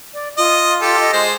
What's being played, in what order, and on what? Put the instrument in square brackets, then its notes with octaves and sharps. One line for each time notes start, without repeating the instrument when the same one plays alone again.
[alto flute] D5
[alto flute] F4 [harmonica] D#5
[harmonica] G4 A4
[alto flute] D#5
[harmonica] G#3 C5